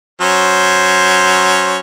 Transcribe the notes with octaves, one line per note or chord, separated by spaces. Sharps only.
F#3 C#4 C5